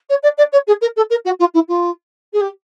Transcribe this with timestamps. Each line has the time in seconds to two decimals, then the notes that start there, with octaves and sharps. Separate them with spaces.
0.09 C#5
0.22 D5
0.37 D5
0.52 C#5
0.67 G#4
0.81 A#4
0.96 A4
1.10 A#4
1.25 F#4
1.39 F4
1.54 E4
1.68 F4
2.33 G#4
2.40 G4